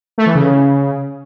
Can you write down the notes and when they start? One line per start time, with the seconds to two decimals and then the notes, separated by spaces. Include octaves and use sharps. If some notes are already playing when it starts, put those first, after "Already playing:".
0.18 A3
0.26 E3
0.35 C#3